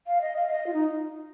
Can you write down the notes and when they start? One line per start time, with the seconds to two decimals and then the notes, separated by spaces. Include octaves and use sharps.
0.07 F5
0.21 D#5
0.37 F5
0.48 F5
0.52 D#5
0.67 F4
0.74 D#4